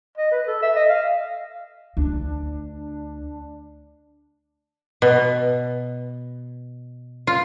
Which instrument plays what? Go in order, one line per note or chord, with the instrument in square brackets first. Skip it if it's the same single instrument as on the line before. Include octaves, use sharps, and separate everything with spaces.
[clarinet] D#5
B4
A4
E5
D#5
F5
[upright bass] D2 [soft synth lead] D4
[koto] B2
F4